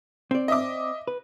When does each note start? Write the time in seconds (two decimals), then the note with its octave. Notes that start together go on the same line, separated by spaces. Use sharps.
0.31 C4 D5
0.48 D#5 E5 D6
1.07 B4